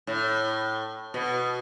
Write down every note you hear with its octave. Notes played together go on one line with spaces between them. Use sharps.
A2
B2